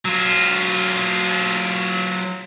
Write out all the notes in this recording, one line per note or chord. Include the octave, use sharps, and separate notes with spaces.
F#3 F4